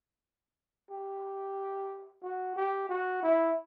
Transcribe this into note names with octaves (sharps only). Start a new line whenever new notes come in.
G4
F#4
G4
F#4
E4